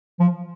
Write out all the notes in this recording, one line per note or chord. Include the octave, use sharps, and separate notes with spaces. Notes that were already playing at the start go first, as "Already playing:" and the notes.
F3